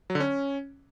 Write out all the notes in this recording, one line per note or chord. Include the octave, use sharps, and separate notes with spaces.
F#3
D3
C#4